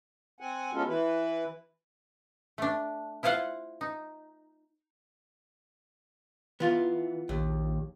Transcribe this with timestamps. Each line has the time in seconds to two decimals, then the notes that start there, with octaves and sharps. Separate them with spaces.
0.40 C4 F#5 G#5
0.73 G#3 B3 C#4 F4 F#4 A4
0.87 E3 E4 B4
2.58 A3 D4
3.23 E4 F4 C5 F5 F#5
3.81 D#4
6.60 E3 B3 F4
7.29 A#1 D#2